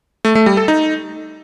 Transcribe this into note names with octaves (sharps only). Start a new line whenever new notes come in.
A3
A3
G3
A4
D#4